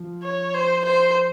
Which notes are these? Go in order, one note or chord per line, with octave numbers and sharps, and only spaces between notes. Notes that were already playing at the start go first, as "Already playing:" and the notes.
Already playing: F3
C#5
C5
C5